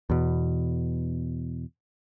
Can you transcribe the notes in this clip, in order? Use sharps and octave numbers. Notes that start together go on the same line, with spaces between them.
E2 B2